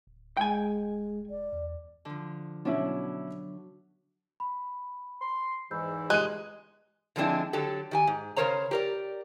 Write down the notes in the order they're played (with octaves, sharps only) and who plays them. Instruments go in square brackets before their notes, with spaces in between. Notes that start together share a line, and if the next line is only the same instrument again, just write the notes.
[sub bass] D1
[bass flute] G#3 [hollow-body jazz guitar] G5 G#5
[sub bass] E1 [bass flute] D5
[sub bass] E2
[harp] D3 F3
[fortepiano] B2 C#4 E4 [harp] F#3 D4
[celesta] B5
[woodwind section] C6
[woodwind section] E2 G#2 E3 [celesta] B5 E6 G6
[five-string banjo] G#3 [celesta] G4 C6 [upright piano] F#6 D#7
[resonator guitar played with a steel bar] D3 F3 G#3 C4 D4 E4
D3 F#3 G4 A4
D#3 G4 G#5
G#2
C#3 E3 A#4 C5 C#5 A#5
G4 A#4 D5